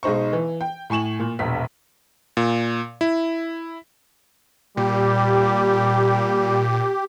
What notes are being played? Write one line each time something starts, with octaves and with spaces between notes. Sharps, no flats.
B1 G#3 D#4 C5 C#6
E3
G5
A2 G#5 C#6 E7 F#7
A#2
E1 A#1 B6
A#2
E4
A#2 G3 G4